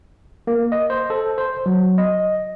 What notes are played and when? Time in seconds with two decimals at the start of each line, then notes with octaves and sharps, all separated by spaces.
0.47 A#3
0.72 D#5
0.90 C5
1.10 A4
1.38 C5
1.66 F#3
1.98 D#5